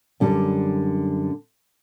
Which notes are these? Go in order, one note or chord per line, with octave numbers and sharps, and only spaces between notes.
F#2 D3 G3